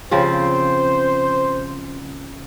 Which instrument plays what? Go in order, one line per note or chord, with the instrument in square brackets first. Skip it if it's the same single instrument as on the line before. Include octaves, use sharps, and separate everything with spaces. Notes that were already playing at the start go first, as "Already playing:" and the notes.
[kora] C#3 F3 C4 [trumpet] C5